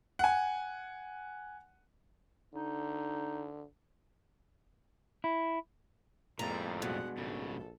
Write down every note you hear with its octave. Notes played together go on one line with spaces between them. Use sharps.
F#5 G#5
D3 D#4
E4
F2 A2 G3 G#3 A#3 A#5
G2 B2 G#3 F#5
A#1 G#2 C#3 A4